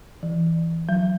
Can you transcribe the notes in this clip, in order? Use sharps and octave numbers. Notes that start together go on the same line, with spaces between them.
E3
F#3